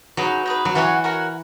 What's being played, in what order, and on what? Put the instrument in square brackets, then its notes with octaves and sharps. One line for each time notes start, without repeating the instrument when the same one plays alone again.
[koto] F#3 [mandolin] D#4 G#4 B4
[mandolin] D#4 G#4 B4
[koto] F#3
[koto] E3 [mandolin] F#4 A#4 C#5 F#5
[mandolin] F#4 A#4 C#5 F#5